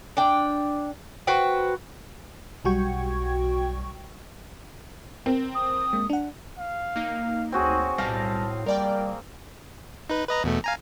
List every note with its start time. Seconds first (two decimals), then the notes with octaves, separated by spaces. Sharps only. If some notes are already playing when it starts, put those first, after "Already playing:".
0.17 D4 G5
1.27 F#4 B4 C5 G5
2.65 B1 G3 F#4 G5 C#6 G#6
5.26 C4 A#4
5.55 D#6
5.93 G#3 A#3
6.10 D4 F#5
6.59 F5
6.96 A#3 D#4
7.52 D2 C4 F#4 G#4 C#5
7.98 B1 A2 G3 F5 A5 A#6
8.66 G3 A#3 A#4 D5 G5
10.10 D#4 B4
10.28 B4 D#5 A#5
10.44 E2 B2 A3
10.64 F5 G#5 A#5